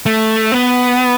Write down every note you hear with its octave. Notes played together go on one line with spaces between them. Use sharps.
A3
B3